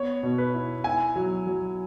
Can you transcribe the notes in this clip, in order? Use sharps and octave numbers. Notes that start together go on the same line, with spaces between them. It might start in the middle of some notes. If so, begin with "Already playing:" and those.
Already playing: B3 C#5
B2
B4
E4
E4 G#5
F#3
F#3